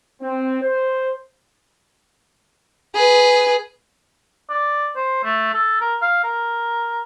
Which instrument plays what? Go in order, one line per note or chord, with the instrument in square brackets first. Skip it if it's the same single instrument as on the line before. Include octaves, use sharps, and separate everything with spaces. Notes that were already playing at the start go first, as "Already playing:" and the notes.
[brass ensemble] C4
C5
[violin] G#4 B4
[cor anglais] D5
C5
A3
A4
A#4
F5
A#4